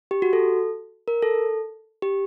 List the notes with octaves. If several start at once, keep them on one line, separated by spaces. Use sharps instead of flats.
G4
F#4
A4
A#4
A4
G4